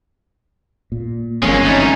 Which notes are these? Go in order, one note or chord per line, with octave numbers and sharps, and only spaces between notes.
A#2
G1 E2 F3 F#3 G#3 A#3 C4 C#4
A3 D#4